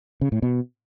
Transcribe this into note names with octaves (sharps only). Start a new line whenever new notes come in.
C#3
A2
B2